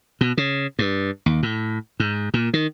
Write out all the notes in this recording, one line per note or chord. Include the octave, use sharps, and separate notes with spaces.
B2
C#3
G2
D#2
A2
G#2
A#2
D#3